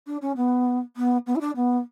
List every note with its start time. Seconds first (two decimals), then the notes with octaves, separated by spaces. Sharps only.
0.07 D4
0.22 C#4
0.37 B3
0.97 B3
1.27 B3
1.36 E4
1.41 D4
1.56 B3